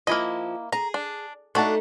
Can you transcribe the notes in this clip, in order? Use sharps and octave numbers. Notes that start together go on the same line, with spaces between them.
F3 A#3 E4 D#5
G#4 A#5
D4
A3 D4 D#4 F#4 A5